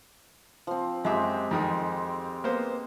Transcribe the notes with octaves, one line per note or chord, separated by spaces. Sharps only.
F3 C4
F#2 G#3 C4 G4 E5
F2 D#3 D#6
A#3 B3 C5